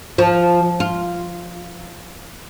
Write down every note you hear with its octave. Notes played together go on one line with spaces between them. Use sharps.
F3
F4